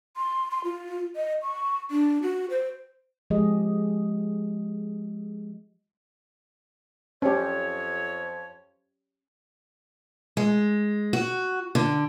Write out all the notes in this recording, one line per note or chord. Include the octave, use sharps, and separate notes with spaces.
C6
C6
F4
D#5
C#6
D4
F#4
C5
F3 G#3 G4 G#4 D#5
F2 C#4 G4 C#5
G#3
F#4
D3